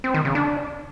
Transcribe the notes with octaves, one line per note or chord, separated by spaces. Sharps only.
C4
D#3
C#3
D4